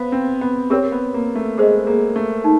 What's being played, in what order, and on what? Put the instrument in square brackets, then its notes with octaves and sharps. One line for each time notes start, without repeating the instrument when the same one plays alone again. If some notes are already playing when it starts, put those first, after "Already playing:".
Already playing: [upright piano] B3 [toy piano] C5 F5
[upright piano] C4
B3
[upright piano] C4 [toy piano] G4 A#4 C#5
[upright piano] B3
A#3
A3
[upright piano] G#3 [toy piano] G#4 C5 D#5
[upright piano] A#3
A3
[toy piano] D#4